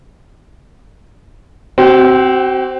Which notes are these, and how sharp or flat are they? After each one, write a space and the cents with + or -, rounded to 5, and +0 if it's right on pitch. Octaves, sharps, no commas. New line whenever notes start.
C4 +0 F#4 +40